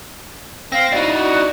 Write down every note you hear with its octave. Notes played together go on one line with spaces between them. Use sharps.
C4 F5 A#6
D#4 E4 F#4 D5
F#4